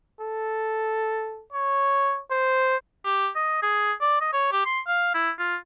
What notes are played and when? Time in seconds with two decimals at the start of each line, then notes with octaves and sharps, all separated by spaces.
0.21 A4
1.53 C#5
2.31 C5
3.05 G4
3.36 D#5
3.62 G#4
4.01 D5
4.21 D#5
4.33 C#5
4.52 G4
4.66 C6
4.87 F5
5.14 E4
5.39 F4